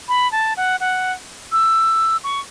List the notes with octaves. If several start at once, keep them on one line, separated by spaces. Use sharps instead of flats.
B5
A5
F#5
F#5
E6
C#6